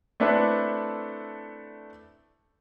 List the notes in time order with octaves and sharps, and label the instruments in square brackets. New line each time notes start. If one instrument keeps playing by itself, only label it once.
[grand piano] A3 C4 D4 E4 A4 B4